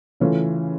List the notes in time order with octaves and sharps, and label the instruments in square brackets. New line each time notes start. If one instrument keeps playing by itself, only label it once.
[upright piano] C#3 E3 A3 C#4 F4